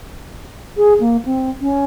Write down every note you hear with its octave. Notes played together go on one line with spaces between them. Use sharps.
G#4
A#3
C4
C#4